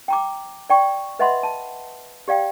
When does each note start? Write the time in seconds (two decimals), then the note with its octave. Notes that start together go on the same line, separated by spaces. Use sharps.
0.08 G5 A#5 D6
0.70 D5 G5 C#6
1.19 B4 D#5 E5 F#5 B5 C6
1.43 A5
2.28 G4 D5 F5 G5